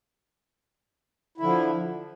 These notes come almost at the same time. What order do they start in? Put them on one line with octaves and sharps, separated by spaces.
E4 D3 F3